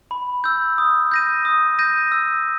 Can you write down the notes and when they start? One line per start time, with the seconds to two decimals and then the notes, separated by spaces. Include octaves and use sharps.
0.11 B5
0.44 E6 G6
0.78 D#6
1.12 G6 A#6 D#7
1.45 D#6
1.79 G6 A#6 D#7
2.12 E6